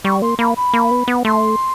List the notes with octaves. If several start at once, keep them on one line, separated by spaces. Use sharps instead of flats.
G3 C#6
A#3 C6
A#3 B5
B5
A#3
B3
B3
A3 C6